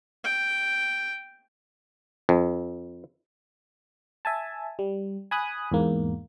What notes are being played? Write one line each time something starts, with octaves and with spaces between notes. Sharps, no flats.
G5
F2
E5 G#5 A5
G3
G#5 B5 D#6 F#6
E2 G#2 A#3